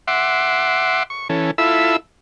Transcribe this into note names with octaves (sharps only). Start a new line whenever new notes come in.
E5 F#5 C6 D6
C#6
E3 C#4 A4
E4 F4 A4 E5 B5 E6